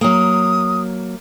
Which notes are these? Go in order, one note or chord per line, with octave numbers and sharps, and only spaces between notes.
F#3 A#3 D#6